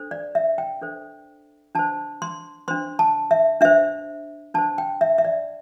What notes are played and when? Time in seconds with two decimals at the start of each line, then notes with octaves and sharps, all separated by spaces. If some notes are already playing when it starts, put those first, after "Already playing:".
Already playing: D4 A4 C5
0.11 D5
0.35 E5
0.58 G5
0.81 D4 A4 C5
1.75 D4 C5 A5
2.22 C6
2.68 D4 C5 C6
2.99 A5
3.31 E5
3.61 D4 C5 E5
4.54 D4 C5 A5
4.78 G5
5.01 E5
5.18 E5
5.25 D5